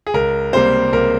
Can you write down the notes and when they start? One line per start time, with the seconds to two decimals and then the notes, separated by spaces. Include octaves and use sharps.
0.07 G#4
0.14 C#2 A#4
0.53 C3 G3 A#3 C5
0.92 C#2 A#4